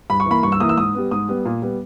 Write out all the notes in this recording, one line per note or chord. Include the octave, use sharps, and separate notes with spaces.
G2 B5
C#6
E3 A#3 B5
G2 C#6
E6
E3 A#3 D#6
E6
G#2 D#6
G3 B3
G#2 D#6
G3 B3
A#2
G3 B3